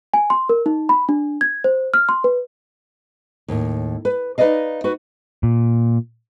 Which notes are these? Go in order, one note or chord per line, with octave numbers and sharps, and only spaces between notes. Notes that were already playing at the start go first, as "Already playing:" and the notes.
G#5
C6
A#4
D#4
B5
D4
G#6
C5
F6
C6
B4
D#2 A2
B4
D#4 B4 C5 D5 D#5 F5
F#4 B4
A#2